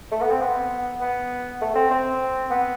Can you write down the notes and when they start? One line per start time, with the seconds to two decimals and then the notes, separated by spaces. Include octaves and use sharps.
0.12 A3
0.21 B3
0.31 C4
0.42 B3
1.01 B3
1.61 A3
1.76 C4
1.91 C4
2.51 B3